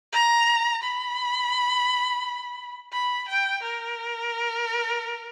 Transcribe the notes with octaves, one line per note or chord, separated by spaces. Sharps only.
A#5
B5
B5
G5
A#4